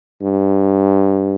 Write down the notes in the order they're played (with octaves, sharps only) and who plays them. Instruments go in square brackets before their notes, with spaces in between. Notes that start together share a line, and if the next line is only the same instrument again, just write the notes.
[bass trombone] G2